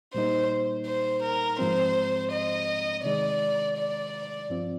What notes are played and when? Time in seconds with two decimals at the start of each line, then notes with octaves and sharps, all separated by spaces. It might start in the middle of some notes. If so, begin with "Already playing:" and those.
0.14 A#2 G3 A#3 D#4 C5
0.86 C5
1.23 A#4
1.59 G#2 F3 G#3 C4 C5
2.31 D#5
3.04 C3 D#3 G#3 D5
3.77 D5
4.50 G2 F3 C4 F4